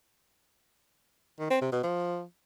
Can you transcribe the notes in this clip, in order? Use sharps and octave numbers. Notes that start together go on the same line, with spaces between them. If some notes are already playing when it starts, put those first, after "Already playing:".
D#3
C4
C3
B2
F3